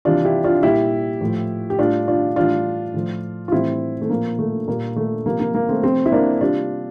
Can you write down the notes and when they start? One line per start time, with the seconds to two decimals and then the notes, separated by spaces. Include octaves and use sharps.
0.05 C3 E3 G3 D4 F4
0.25 E4 G4
0.44 D4 F4
0.63 A#2 G3 E4 G4
1.21 A2 F3
1.70 G4
1.79 A2 G3 D4 F4
2.08 D4 F4
2.36 A2 E3 G3 D4 F4
2.94 A2 F3
3.48 F4
3.52 A2 E3 G3 C4 E4
4.02 A3
4.10 A#2 F3 A#3
4.39 A3
4.68 A#2 G3 A#3
4.96 A3
5.26 C3 F3 A#3
5.40 A#3
5.55 A#3
5.69 A3 C4
5.83 C3 F3 A3 C4
6.06 E4
6.12 A#3 D4
6.41 C3 G3 D4 F4